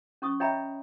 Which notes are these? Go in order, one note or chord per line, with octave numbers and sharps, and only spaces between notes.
C#4 C#6 D#6
C#5 D#5 E5 G5 A#5 B5